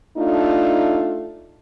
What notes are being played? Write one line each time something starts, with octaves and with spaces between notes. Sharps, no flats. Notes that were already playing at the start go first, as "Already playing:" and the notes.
A3 D4 D#4 F4